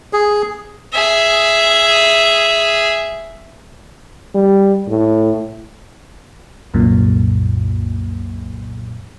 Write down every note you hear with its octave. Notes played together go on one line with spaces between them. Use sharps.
G#4
G#4 E5
G3
A2
C2 F#2 A#2